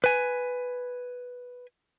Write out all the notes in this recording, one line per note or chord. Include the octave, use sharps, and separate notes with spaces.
B4 G#5